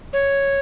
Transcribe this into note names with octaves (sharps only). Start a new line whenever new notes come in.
C#5